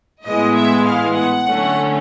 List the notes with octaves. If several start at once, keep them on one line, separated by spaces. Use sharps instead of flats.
A2 E3 G#3 B3 D#5
E5
F5
F#5
D3 F#3 A3 C#4